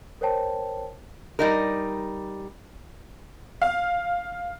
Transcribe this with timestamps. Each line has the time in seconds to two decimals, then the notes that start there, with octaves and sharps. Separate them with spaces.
0.21 A#4 C5 C#5 G5 A5
1.39 G3 D#4 A#4
3.62 F5